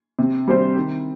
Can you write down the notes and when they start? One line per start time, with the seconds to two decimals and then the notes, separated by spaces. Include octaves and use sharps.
0.19 C3
0.48 G3 C4 G4 C5
0.76 D#3